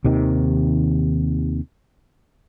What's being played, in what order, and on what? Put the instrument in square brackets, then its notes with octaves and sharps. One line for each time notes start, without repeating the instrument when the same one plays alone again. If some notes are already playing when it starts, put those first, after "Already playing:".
[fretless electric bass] D#2 C3 D#3